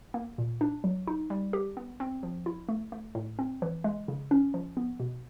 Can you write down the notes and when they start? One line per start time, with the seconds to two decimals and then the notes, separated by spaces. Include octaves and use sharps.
0.14 A#3
0.38 A#2
0.61 D4
0.84 F#3
1.07 D#4
1.30 G3
1.53 G4
1.77 B3
2.00 C4
2.23 F3
2.46 E4
2.69 A3
2.92 A3
3.15 A2
3.39 C4
3.62 E3
3.84 G#3
4.08 C#3
4.31 C#4
4.54 F3
4.77 B3
5.00 B2